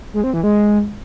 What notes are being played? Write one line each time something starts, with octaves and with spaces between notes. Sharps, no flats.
G#3
C4
E3
G#3